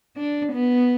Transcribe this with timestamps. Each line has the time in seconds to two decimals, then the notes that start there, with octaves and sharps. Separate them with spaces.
0.17 D4
0.53 B3